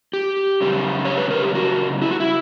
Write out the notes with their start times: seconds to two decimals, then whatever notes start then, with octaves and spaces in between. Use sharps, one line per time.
0.13 G4
0.61 F#2 C#3 G3
1.05 C#5
1.18 B4
1.31 A#4
1.42 G4
1.55 F#4
2.02 E4
2.11 F#4
2.20 E4